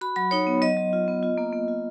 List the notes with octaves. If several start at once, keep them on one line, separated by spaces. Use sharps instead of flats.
F#4 B5
F#3 B5
D#4 C#5
B3
F#3 D#5
F#3
F4
B3
F4
A#3
A#3
F4